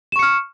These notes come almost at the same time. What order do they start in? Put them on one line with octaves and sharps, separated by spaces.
E7 C#6 C#7 F6